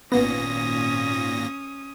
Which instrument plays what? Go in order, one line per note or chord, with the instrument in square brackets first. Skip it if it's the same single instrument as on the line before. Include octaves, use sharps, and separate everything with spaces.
[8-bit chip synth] G#1 A#2 A#6 [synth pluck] B3 [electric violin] C#4 D#6